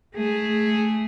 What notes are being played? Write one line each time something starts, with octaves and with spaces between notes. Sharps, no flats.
A3 G#4